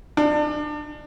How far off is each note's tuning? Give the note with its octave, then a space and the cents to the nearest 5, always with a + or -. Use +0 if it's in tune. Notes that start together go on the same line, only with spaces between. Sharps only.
D4 +30